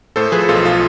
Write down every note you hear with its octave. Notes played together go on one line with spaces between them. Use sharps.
A2 A4 C5
F3 G#4 B4
B1 F4 A4
F4